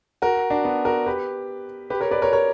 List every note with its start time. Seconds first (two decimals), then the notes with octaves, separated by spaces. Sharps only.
0.22 F#4 A#4
0.50 D4 F#4
0.64 B3
0.85 F#4 A#4
1.06 G4 B4
1.90 G4 B4
2.01 A#4 C#5
2.11 B4 D5
2.22 A#4 C#5
2.33 A#4 C#5